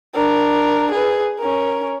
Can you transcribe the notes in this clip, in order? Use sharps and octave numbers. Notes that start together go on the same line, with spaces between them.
D4 A#4
G#4 B4
C#4 A#4